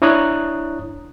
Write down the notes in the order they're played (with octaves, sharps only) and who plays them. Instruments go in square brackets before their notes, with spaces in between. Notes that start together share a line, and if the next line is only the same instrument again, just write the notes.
[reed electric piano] D4 E4 C#5 A#5 D#6 F#6